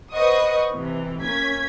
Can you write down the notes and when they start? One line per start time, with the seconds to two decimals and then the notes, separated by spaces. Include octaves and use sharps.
0.13 B4 C5 D#5 F#5 C#6 D#6
0.74 C3 E3
1.22 A#3 C#4 G#6 B6